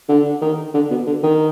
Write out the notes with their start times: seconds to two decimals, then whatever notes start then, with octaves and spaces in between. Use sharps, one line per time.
0.09 D3
0.42 D#3
0.74 D3
0.90 B2
1.07 D3
1.23 D#3